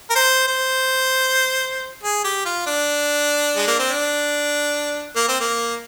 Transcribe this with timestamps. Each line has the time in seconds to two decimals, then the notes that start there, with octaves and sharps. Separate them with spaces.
0.10 A#4
0.15 C5
0.47 C5
2.03 G#4
2.24 G4
2.45 F4
2.66 D4
3.56 G#3
3.67 A#3
3.79 C4
3.90 D4
5.16 A#3
5.28 C4
5.41 A#3